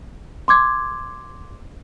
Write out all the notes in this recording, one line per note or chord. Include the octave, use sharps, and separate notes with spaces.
C6 D6 G#6